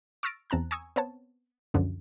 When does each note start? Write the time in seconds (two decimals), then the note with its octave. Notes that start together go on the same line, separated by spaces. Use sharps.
0.23 C#6 E6 F6 A6 A#6 D7
0.50 E2 C4 A5 A#5 F#6
0.71 G#5 A#5 C#6 D#6 E6 G#6
0.96 B3 C4 C#5 A5
1.74 C#2 F#2 D3 F3